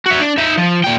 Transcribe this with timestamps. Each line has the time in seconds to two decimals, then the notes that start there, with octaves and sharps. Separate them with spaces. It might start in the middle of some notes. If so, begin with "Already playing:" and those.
0.06 F#4 E5
0.20 D4
0.38 D#4 E5
0.57 F3
0.84 A#2 G5